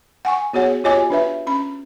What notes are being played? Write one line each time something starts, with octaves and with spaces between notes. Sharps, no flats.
F#5 G#5 C#6
B3 F#4 G#4 C#5 F#5
F4 G4 C#5 D#5 G#5 D6
D4 B4 E5
C#4 B5